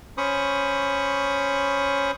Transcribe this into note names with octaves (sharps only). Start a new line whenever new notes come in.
C#4 C5 B5 C#6 D#6